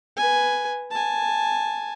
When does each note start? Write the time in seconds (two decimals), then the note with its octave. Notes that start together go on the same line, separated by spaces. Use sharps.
0.17 B4 G#5
0.91 G#5 A5